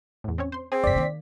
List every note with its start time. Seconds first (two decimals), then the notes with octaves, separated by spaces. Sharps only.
0.24 E2 A2
0.38 C4 C#4 C#5
0.52 C5 C6
0.72 C4 G#4
0.84 F1 F#2 D5 B6
0.96 D#3 A#3